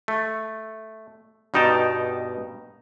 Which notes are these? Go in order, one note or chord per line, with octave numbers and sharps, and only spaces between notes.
A3
G2 B2 D#4 G5 A5